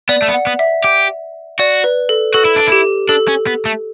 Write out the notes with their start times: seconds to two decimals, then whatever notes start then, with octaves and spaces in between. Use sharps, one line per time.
0.09 B3 D5
0.22 A3
0.28 B3
0.34 F#5
0.47 B3
0.59 E5
0.84 G4
1.59 F#4 D5
1.84 B4
2.09 A4
2.34 F#4 A4
2.45 E4
2.56 D4
2.67 E4 G4
3.09 D4 A4
3.28 C#4
3.47 B3
3.65 A3